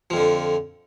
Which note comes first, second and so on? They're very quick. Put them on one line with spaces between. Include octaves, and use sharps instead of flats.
F3 F2 D3